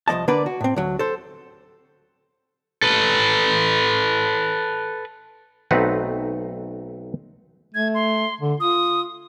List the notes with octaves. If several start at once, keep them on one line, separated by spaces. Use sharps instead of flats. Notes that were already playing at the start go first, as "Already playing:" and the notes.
C2 F3 A3 D#5 A5
D3 A#3 D4 B4 D5
F#4
A2 C4
D2 F#3
A4 C5
A4 B4
B1 A3 C4 D#4 B4 F#5
A3 G#6
C6
D3
F4 D#6